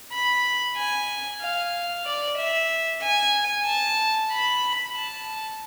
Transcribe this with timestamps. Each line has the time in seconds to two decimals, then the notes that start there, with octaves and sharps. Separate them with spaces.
0.13 B5
0.77 G#5
1.41 F5
2.05 D5
2.38 E5
3.02 G#5
3.67 A5
4.31 B5
4.95 A5